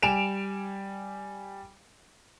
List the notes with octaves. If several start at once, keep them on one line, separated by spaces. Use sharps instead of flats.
G3 G#5 D7 E7 F7